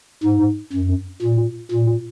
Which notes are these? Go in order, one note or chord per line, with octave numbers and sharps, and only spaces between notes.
G#2
F#2
A#2
A#2